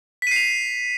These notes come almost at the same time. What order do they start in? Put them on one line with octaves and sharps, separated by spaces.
B6 D#7 C7 F7